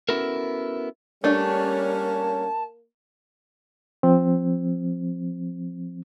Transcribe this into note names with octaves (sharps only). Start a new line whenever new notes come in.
B3 C#4 E4 F#4 A4 A#4
G3 A3 A#3 C#4 D4 A5
F3 C4